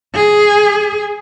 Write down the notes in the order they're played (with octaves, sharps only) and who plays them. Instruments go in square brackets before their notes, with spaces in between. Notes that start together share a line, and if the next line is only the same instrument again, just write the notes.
[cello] G#4